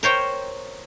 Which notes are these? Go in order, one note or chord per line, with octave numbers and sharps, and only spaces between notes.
A#4 C5 C#5 G5